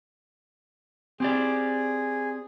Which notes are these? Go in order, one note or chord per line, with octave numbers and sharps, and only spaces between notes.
C4 G4 G#4 D5